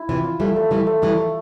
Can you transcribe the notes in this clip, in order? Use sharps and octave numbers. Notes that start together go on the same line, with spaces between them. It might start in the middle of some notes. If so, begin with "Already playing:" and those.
Already playing: E4
C3 E3 F4
F4
E3 G3 A3
A3
E3 G3 A3
A3
E3 G3 A3
A3